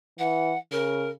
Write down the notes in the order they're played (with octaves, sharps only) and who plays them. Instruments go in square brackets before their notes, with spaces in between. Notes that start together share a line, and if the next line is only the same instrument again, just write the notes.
[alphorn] E3 [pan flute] F#5
[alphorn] C#3 [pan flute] A#4